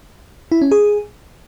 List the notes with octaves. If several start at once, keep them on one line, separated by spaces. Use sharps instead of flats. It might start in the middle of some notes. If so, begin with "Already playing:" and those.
E4
C#4
G#4